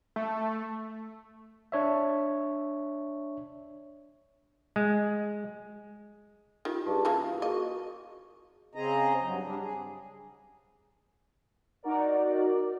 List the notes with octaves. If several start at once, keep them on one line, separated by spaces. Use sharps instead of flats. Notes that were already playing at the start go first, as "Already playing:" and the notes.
A3
D4 C#5 E5
G#3
D#3 F4 G4
G2 G4 G#4 A5
C#3 E3 A#3 F4
A#3 F#4 G#4 D#5
C#3 C4 G#4 D#5 A#5
G2 F#3
G3 D4
G#4
D#4 F#4 A#4 D5